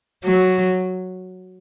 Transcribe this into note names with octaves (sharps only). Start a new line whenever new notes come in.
F#3